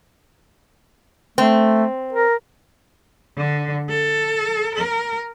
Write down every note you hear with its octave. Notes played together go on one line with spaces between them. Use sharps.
A3 C4
A#4
D3
A4
A#4